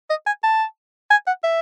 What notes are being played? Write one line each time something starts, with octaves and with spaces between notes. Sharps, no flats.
D#5
G#5
A5
G#5
F#5
E5